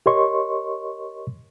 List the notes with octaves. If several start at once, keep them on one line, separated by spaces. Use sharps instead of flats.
G4 A#4 C#5 D#5 C6 C#6